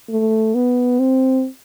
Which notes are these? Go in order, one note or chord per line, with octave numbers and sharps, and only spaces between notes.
A3
B3
C4